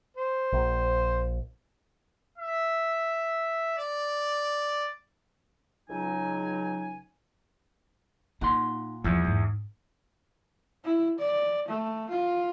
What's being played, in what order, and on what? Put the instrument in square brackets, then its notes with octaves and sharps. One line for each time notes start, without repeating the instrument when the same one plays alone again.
[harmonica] C5
[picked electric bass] A#1
[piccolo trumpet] E5
D5
[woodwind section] C#2 F#3 D#4 G#5
[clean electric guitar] A#2 F#5 C6 [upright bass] D#4
[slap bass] E2 [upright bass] F3 G3
[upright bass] G#2
[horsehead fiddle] E4
D5
A3
F4